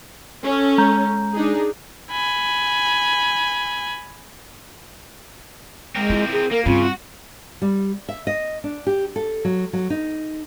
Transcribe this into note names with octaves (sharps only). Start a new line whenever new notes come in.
C#4 A4
G#3 A#5 G6
D4 D#4 G#4
G#5 B5
G#3 C4 A#4
E4 F4
G#4
A#3 A#4
G2 C#3 C4 F4
F#4
G3
E5
D#5
D4
G4
A4
F#3
F#3
D#4